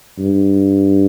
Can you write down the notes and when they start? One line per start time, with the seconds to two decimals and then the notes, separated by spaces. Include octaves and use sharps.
0.19 G2